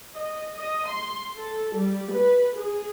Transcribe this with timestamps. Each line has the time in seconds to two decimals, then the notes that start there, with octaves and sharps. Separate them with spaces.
0.14 D#5
0.56 D#5
0.90 C6
1.37 A4
1.74 G3
2.11 B4
2.56 G#4